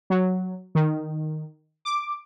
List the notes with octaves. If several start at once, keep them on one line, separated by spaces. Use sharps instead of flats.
F#3
D#3
D6